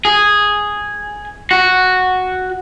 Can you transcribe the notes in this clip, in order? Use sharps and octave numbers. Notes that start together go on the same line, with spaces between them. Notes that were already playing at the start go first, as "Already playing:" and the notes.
G#4
F#4